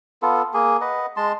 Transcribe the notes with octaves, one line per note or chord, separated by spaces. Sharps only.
B3 F4 A4
A#3 G#4
B4 D#5 F#5
G#3 A5 C6